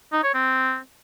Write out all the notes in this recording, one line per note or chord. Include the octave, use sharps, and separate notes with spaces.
D#4
C#5
C4